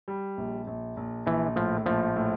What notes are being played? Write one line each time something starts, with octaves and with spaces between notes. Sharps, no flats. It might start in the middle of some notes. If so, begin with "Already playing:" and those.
G3
A#1
A#1
A#1
A#1 E3
A2 F3
A#1 F3
A2